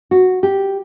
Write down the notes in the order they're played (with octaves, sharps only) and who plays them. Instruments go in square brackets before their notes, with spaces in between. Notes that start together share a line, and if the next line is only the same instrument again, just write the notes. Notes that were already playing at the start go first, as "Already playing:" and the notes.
[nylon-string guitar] F#4
G4